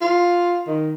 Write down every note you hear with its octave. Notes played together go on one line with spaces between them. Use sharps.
F4
D#3